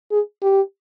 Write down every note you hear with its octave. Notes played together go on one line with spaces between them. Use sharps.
G#4
G4